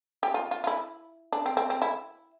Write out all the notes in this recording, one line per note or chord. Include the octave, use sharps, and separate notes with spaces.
G4
F4
F4
F4
E4
D4
C4
C4
C4
E4